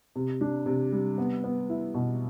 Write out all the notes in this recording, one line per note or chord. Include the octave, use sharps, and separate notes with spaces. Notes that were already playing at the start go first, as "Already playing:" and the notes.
C3
D4
C3
G3
B3
B3
E4
B2